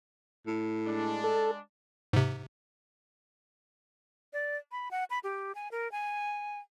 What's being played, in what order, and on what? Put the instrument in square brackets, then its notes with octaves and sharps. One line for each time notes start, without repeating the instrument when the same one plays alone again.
[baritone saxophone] A2
[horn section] G#3 D4
[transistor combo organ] A4
[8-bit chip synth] G#2 C3
[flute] D5
B5
F#5
B5
G4
G#5
A#4
G#5